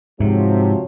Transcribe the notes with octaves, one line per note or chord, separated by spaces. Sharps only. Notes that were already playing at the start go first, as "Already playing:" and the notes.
G#2 C3 F3 F#3